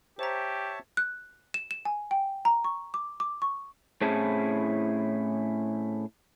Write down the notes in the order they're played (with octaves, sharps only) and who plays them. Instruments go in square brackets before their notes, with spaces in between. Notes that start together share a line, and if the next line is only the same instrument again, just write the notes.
[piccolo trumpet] G4 [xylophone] C5 A#5 [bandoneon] C#5 E5 A5
[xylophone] F#6
E7
E7
G#5
G5
A#5
C#6
D6
D6
C#6
[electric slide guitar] A2 C4 C#4 E4 G#4 A5